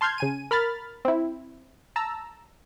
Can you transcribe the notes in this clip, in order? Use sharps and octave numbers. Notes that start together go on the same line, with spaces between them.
A5 C6 F6 G6 G#6
C#3 G#5 D#7
A#4 B5 F6 A6
C4 E4
A5 A#5 E6